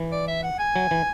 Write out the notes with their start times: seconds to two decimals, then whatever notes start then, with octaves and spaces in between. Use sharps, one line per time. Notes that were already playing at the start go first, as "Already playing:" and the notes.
Already playing: E3
0.12 D5
0.28 E5
0.43 F#5
0.59 G#5
0.76 F#3
0.91 E3